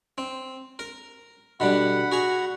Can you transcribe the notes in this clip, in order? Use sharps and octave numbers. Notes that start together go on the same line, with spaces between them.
C4
A#4
B2 D3 G3 F#5 B5
F#4 G#4 A#5